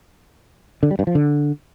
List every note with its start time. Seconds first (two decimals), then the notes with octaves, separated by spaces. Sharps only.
0.83 D3
0.91 G3
0.99 G2
1.07 F3
1.15 D3